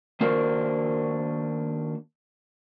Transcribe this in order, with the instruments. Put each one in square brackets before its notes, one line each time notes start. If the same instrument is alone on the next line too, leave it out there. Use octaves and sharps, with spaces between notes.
[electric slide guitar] D#3 A#3 D4 F#4 A#4 C5